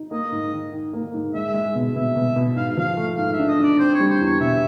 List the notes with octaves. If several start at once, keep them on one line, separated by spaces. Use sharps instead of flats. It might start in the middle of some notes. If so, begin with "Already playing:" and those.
Already playing: D#4
A#3 D#5
G#2
D#3
D#3
A#3
G#2
G#3 E5
G#3
B2
B2 E5
B2
B2
G#2 F5
F3 F5
A3
G#2 F5
E5
D4
D#5
D4 D5
C4 C5
G3 C#5
C5
E2
C#5
B2 E5